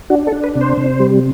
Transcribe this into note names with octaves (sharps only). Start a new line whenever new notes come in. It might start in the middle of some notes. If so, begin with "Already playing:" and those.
D4 F#4
A4
D4
B4
C3
C5
C3
G3